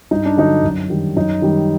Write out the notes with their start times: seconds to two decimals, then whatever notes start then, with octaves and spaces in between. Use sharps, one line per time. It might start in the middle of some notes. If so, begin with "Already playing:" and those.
0.11 G2 D#4
0.25 D4
0.37 D3 F#3 D#4
0.63 F#2
0.90 D#3 G3
1.16 F#2 D#4
1.42 D#3 G3